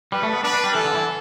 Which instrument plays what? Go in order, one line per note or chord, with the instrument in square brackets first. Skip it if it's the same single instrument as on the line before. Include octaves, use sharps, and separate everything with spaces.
[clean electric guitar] G3 [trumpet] B4
[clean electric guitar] A3
B3
[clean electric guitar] D4 [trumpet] B4
[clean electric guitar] D4
G3
[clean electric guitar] E3 [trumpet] A4
[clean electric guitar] D3
E3